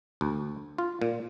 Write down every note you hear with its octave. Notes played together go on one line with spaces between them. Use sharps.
D2
F4
A#2